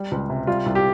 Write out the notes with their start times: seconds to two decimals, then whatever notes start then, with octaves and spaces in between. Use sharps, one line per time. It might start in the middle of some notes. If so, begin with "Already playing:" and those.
Already playing: G3
0.11 C#2
0.30 C3
0.47 G3 F4
0.66 C2
0.75 G4